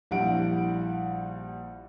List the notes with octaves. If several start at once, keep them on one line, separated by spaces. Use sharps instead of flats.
A#1 G3 E4 F#5 D7